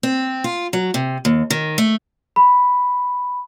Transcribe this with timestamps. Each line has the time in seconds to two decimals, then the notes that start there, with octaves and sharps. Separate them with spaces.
0.03 C4
0.44 F4
0.73 F#3
0.94 C3
1.25 D#2
1.50 D#3
1.78 A3
2.36 B5